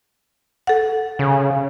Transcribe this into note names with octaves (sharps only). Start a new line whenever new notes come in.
A4 F#5
C#3